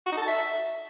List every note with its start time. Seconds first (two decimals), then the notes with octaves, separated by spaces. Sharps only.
0.07 F#4
0.12 D#4
0.17 A4
0.23 A5
0.28 E5